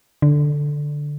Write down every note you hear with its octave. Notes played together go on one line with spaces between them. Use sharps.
D3